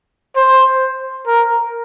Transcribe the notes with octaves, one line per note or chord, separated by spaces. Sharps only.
C5
A#4